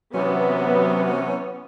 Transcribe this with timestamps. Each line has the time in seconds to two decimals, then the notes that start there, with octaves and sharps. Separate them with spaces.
0.14 C3 E3 F#3 B3 C#4